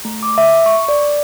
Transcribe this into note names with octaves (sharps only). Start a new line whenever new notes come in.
A3
D6
E5
C#6
D5